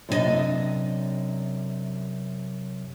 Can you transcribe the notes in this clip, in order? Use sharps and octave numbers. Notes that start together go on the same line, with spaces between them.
F#2 C3 D4 E4 D#5